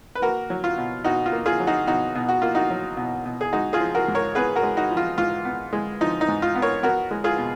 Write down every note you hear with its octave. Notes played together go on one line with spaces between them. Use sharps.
B4
A#3 F#4 A#4
F#3
F4
B2
B2 D#4 F#4
F4
A#3
F4 G#4
F#3
D#4 F#4
B2 D#4 F#4
B2
F#4
A#3 F4
D#4 F#4
F#3
B2
B2
G#4
G#3 D#4 F#4
F4 G#4
F3
F#4 A#4
G#2
A#4 C#5
B3 G#4 B4
F#4 A#4
G#3
D#4 F#4
F3
F4
G#2 F4
B3
G#3
F3 D#4
D#4
G#2
F4
B3
A#4 C#5
B3 F#4 A#4
G#3
F4 G#4
B2